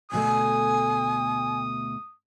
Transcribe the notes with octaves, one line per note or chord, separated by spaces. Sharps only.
D2 B2 A3 G#5 D#6